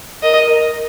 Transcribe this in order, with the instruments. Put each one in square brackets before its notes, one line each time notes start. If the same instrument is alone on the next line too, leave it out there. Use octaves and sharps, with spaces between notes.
[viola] A#4 [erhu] D#5